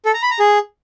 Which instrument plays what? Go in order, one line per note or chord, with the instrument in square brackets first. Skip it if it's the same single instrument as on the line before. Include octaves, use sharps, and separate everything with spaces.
[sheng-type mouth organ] A4
A#5
B5
A#5
G#4